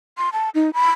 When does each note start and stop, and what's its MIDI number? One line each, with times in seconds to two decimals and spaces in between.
0.18 0.29 84
0.33 0.49 81
0.55 0.70 63
0.74 0.91 83